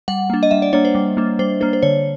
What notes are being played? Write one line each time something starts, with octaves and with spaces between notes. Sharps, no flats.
G3 F#5
A#3 D4
D#5
G3 E5
D5
A#3 D4 C#5
C5
G3
A#3 D4
G3 C5
A#3 D4 C5
C5
D3 C#5